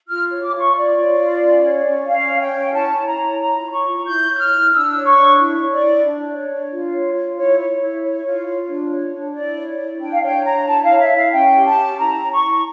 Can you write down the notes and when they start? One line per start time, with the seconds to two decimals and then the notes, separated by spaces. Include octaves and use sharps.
0.08 F4 F6
0.32 C#5
0.42 D6
0.54 F4 C#6
0.74 C#5 D5
0.97 F4
1.19 F4
1.41 C#4
1.63 C#5
1.86 C#4
2.07 C#4 F5
2.29 C#5
2.40 G5
2.52 C#4
2.73 E4 A5
2.96 C#5
3.06 A#5
3.18 E4
3.39 F4 A#5
3.62 C#5
3.72 C#6
3.84 F4
4.05 E4 G6
4.28 C#5
4.34 G6
4.38 F6
4.50 E4
4.72 D4 E6
4.94 C#5
5.05 C#6
5.16 D4
5.38 E4
5.59 C#5
5.71 D5
5.82 E4
6.04 D4
6.26 C#5
6.48 D4
6.70 F4
6.92 C#5
7.14 F4
7.36 E4 C#5
7.59 C#5
7.80 E4
8.02 C#5
8.25 F4
8.46 F4
8.68 D4
8.90 C#5
9.12 D4
9.34 E4 D5
9.57 C#5
9.78 E4
10.00 D4 G5
10.12 F5
10.22 C#5 G5
10.44 D4 A#5
10.66 E4 A5
10.83 F5
10.89 C#5
11.00 E5
11.10 E4
11.16 F5
11.32 C#4 G5
11.55 G4
11.65 A5
11.76 C#4
11.98 E4 A#5
12.21 C#5
12.31 C#6
12.43 E4